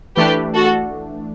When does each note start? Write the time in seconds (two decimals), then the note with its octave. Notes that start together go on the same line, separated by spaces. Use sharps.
0.17 E3 A3 D4 G4 B4
0.54 F#4 A4